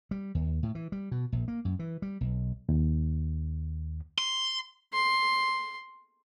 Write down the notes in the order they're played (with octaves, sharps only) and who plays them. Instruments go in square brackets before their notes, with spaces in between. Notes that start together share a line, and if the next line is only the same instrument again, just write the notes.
[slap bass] G3
D#2
A2
E3
G3
B2
A#1
A#3
F#2
E3
G3
B1
[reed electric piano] D#2
[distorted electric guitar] C6
[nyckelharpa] C6